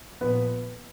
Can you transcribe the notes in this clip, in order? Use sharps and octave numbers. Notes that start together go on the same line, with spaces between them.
A#2 F3 B3 B4